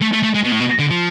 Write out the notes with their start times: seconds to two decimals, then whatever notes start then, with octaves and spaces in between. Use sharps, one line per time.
0.01 A3
0.13 A3
0.23 A3
0.34 G#3
0.43 B2
0.51 A2
0.60 B2
0.79 D3
0.90 F3